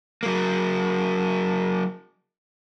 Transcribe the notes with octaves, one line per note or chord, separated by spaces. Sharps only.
F#3 A#3